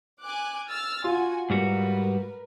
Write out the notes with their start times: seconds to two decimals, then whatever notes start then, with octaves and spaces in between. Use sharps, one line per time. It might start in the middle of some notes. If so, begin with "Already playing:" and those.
0.21 G#5 D6 F#6
0.68 E6 F6 A6
1.04 F4 F#4 G#5
1.50 G#2 G3 F#4 A#4 B4